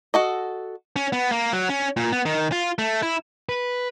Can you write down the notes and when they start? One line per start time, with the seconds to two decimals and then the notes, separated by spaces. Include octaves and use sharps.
0.14 F#4 A4 D#5
0.96 C#4
1.13 B3
1.32 A#3
1.53 F#3
1.69 C#4
1.97 A#2
2.12 B3
2.26 D#3
2.52 F4
2.78 A3
3.02 E4
3.49 B4